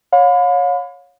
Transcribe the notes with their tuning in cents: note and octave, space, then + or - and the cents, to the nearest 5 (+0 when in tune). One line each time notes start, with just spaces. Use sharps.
C#5 +0 F5 +40 B5 +30